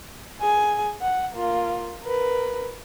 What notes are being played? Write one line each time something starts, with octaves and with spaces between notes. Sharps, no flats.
G#4 G#5
F#5
A#3 F4
A#4 B4